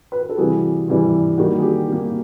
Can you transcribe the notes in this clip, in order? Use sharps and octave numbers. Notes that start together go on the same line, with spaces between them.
B4
A#4
A4
C3 E3 G3 F#4 G#4
C3 E3 G3
D#3 G3 A#3 F#4
G#4
G4
D#3 G3 A#3